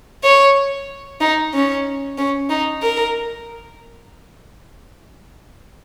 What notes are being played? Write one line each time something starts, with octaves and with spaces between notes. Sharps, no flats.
C#5
D#4
C#4
C#4
D#4
A#4